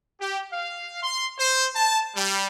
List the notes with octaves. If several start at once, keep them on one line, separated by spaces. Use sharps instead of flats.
G4
F5
C6
C5
A5
G3